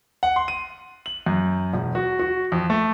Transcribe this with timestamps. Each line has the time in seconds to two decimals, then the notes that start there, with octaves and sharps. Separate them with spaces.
0.23 F#5
0.36 C6
0.48 D#7
1.06 F#7
1.26 F#2
1.74 E1
1.95 F#4
2.19 F#4
2.52 F2
2.70 A3